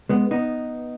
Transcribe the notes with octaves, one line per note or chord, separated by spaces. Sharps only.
G#3 B3
B3 D#4